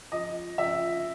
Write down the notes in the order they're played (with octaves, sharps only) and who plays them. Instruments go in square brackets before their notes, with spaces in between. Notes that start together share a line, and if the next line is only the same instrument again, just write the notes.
[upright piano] F3 D#5
F3 E5